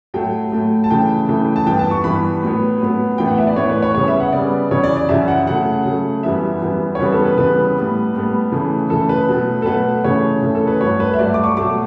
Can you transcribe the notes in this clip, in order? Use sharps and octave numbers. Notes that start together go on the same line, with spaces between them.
A2 F#3 A3 G5
A2 F#3 A3
A5
C#3 E3 A3 G5
C#3 E3 A3
A5
G2 E3 B3 G5
A5
C#6
G2 E3 B3 B5
A2 F#3 B3
A2 F#3 B3
A2 E3 B3 G5
F#5
E5
D5
A2 E3 B3 C#5
B4
C#5
C#3 G3 B3 C#5
E5
F#5
C#3 G3 B3 D5
F#2 C#3 E3 C#5
D5
D5
F#2 C#3 E3 E5
F#5
C#3 F#3 A3 F#5
C#3 F#3 A3
F#2 E3 G3 B3 E5
F#2 E3 G3 B3
C#5
C#3 E3 G3 B3 B4
A4
B4
C#3 E3 G3 B3 B4
A2 G3 B3
A2 G3 B3
C#3 E3 A3
C#3 E3 A3 A4
B4
B2 F#3 A3
A4
B2 F#3 A3 B4
C#3 E3 A3 C#5
C#3 E3 A3
A4
B4
G2 F#3 A3 C#5
B4
E5
G2 F#3 A3 D5
D6
C#6
B2 F#3 A3 D6